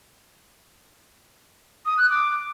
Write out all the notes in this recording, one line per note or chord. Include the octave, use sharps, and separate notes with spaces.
D#6
F#6
D6